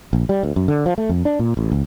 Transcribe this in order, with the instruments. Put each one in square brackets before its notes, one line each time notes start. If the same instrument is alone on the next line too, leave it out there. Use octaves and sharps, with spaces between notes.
[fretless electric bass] A#1
G3
D2
F#2
D3
F3
A3
F2
D4
A#2
A1
C#2